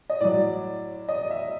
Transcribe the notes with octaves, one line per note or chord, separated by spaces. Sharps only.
D#5
A2 F#3 D5
D#5
E5